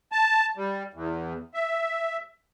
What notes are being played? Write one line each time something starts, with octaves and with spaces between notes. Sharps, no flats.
A5
G3
E2
E5